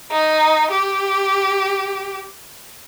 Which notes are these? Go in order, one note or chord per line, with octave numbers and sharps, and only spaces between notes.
D#4
G4